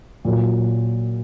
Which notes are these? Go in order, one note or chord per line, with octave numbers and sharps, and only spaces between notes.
A#2 F#3